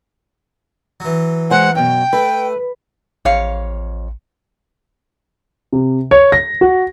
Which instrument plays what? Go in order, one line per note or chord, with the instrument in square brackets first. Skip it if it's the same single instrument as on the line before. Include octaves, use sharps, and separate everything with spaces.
[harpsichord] E3 F#3
[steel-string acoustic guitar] G#3 C5 G#5 [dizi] F#5
[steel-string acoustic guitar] F#2 B2 [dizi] G5
[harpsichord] A3 [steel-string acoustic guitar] B4
[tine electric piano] A1 [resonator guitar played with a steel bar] F2 C#5 F5
[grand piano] C3
C#5
A#6
F#4